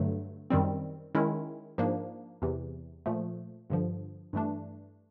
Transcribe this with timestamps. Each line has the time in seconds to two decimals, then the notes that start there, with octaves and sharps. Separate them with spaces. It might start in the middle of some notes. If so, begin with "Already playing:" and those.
Already playing: G2 D3 F#3 A3
0.50 F#2 D#3 G3 C4
1.15 D#3 G#3 C#4 E4
1.78 G#2 F3 A#3 D4
2.42 E2 C3 E3
3.06 A#2 F3 A3
3.70 G2 D3 F3
4.33 G2 E3 A3 D4